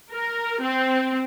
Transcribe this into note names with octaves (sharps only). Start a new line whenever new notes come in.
A#4
C4